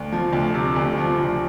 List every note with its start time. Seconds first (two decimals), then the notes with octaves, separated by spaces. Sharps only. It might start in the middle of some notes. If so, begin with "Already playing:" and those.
Already playing: D2
0.12 F3
0.33 D2
0.54 C3
0.76 D2
0.98 F3
1.19 D2